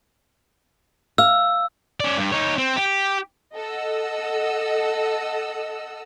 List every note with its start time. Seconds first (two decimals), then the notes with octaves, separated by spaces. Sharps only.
1.18 F5 E6
2.00 C#4 D5
2.18 G2
2.32 D#4 C#5
2.58 C4
2.76 G4
3.55 A4 D#5 F#5 E6